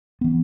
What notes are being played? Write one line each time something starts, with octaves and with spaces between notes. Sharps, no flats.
E3 B3